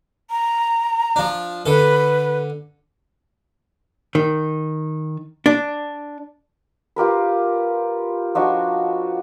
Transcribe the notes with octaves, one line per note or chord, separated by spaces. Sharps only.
A#5
F3 D4
D3 A4 B4
D#3
D4
F4 G4 A#4 B4
F3 D4 D#4 F#4